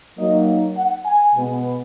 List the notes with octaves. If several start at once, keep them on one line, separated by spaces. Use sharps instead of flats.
F#3 A#3 D#4 D#5
F#5
G#5
B2 G#3 B3